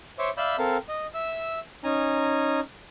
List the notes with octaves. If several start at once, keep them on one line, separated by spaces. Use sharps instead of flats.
C5 C#5 E5 D6
D5 E5 F5 B5 E6 G6
C4 A4 A#4 F5
D#5
E5 E6
C#4 D#4 G#5 A#5